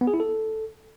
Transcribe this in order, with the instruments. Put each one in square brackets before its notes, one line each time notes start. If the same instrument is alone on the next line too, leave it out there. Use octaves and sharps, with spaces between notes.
[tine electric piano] B3
G#4
E4
A4